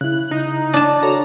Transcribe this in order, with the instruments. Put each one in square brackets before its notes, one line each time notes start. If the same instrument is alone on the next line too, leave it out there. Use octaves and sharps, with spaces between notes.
[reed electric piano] C#3 E4 [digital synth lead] F#6
[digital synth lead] D#4
[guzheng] D4 A5
[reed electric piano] F#4 A4 C#5 [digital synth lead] A#5